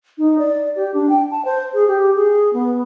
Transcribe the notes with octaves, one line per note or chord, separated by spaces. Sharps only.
D#4
D5
G4
D4
G5
A5
C5
G#4
G4
G#4
B3